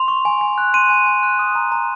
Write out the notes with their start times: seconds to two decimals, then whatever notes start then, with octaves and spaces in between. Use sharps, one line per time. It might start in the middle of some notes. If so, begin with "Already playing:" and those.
Already playing: C6 F7
0.08 C#6
0.25 G#5
0.41 G#5
0.58 F#6
0.74 C6 D#7
0.90 G#5
1.06 G#5
1.23 F#6
1.39 D#6
1.55 A#5
1.72 A#5